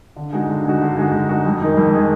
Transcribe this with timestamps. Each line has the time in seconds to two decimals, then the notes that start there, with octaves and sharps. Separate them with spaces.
0.16 D3
0.33 G#3 D#4 F#4
0.50 D3
0.65 G#3 D#4 F#4
0.82 D3
0.97 G#3 D#4 F#4
1.14 D3
1.29 G#3 D#4 F#4
1.46 F2
1.62 D#3 G#3 D#4
1.77 F2
1.93 D#3 G#3 D#4